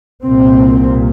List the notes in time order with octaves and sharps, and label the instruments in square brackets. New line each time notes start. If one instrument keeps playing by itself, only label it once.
[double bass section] C2 A#2 C4